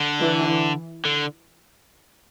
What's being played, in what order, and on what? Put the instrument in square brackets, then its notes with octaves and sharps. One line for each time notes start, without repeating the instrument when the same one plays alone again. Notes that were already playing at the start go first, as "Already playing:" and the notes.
Already playing: [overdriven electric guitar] D3
[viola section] E3
[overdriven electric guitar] D3